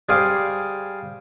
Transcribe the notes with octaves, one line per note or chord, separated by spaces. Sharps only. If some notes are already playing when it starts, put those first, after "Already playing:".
G3 G#4 C5 F5 D6